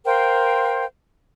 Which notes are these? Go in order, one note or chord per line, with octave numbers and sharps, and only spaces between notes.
A#4 C5 F5 G5